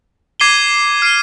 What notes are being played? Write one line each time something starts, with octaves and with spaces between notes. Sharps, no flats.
D6 G#6 C7 D#7 G7
F6 C7 D#7